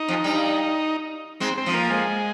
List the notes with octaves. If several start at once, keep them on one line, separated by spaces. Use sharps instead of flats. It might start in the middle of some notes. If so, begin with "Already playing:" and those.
Already playing: D#4
F2 F3
G2 G3
G#2 G#3 C4
C4
F2 F3
A#3
G#3